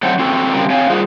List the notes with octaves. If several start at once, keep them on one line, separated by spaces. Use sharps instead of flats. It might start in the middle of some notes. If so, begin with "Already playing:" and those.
F#3 A3 C4 A4 C5 F#5
C4 F#4 A4
C#3 G3 C4 A#4
C4 C#5 F5 G#5
G3 F4 F#4 G#4 C5